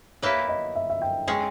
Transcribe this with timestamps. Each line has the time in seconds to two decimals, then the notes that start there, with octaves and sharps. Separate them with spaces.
0.22 A#3 E4 G4 B4 C#5
0.49 D#5
0.75 E5
0.90 E5
1.02 G5
1.28 G#3 C#4 G#4 G5